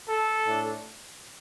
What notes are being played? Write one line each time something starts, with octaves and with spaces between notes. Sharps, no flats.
A4
A2 A3 D4